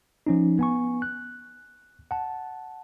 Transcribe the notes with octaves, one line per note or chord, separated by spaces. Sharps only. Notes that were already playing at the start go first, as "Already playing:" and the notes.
F3 C#4 D#4
B3 G#5 C#6
F#6
F#5 A5